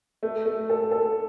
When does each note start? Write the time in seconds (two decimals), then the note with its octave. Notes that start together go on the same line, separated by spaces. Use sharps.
0.23 A3
0.45 A3
0.70 A4
0.91 A4